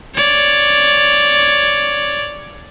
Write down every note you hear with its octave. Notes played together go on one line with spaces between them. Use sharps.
C#5 D5